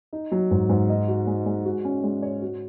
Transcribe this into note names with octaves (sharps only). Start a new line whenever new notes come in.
D#4
F#3
G#2
G#2
D#5
F#4
G#3
G#3
F#4
C#4
G#3
C#5
F#4